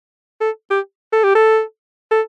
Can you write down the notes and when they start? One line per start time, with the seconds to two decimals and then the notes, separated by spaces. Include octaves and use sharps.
0.41 A4
0.70 G4
1.13 A4
1.24 G4
1.35 A4
2.11 A4